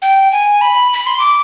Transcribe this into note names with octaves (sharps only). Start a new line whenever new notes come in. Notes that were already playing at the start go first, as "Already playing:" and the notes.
G5
G#5
B5
B5
C6
D6